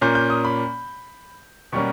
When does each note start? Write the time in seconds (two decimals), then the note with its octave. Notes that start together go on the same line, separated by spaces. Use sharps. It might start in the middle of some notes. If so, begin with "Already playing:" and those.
0.01 A#2 A#3 C#4 G6
0.15 G6
0.30 D#6
0.45 B5
1.72 B2 G3 A#3 C#4 C#6